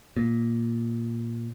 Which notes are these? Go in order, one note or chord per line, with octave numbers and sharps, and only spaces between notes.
A#2